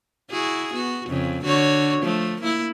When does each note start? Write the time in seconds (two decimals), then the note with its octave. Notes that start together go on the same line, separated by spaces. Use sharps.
0.31 E4 F#4 G#4
0.73 B3 F#4
1.08 F2 C#3
1.44 D3 F#4 C#5
2.02 F3 A3
2.41 A#3 E4